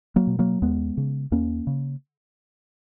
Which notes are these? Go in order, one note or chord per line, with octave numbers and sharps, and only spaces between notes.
F#3 A#3
B2
F#3 A#3
D#2 G#3 B3
C#3
D#2 A#3 C#4
C#3